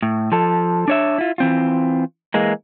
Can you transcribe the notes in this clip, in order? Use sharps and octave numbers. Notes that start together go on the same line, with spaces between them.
A2
F3 A4
D4 C#5 E5
E4 F4
E3 C4 F4
E3 G#3 A#3